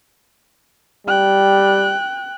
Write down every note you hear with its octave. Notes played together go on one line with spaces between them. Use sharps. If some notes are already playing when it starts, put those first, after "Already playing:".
G3 G5 F#6